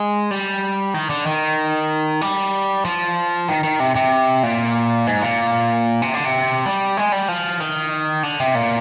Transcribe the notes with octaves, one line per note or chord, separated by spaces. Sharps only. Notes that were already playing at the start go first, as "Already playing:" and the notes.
Already playing: G#3
G3
D#3
D3
D#3
G3
F3
D#3
D#3
C3
C3
A#2
G#2
A#2
C3
D3
C3
G3
G#3
G3
F3
D#3
D3
C3
A#2